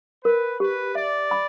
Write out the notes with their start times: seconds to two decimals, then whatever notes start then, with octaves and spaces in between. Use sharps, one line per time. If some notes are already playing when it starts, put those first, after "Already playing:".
0.24 A#4 B4
0.60 G4 B4
0.95 D5 E5
1.31 B5